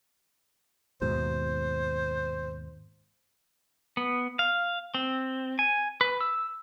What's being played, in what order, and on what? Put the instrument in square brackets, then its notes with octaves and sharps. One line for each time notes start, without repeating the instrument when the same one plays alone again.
[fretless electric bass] D#2 G#2 B2 [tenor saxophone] C5
[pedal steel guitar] B3
F5
C4
G#5
B4
E6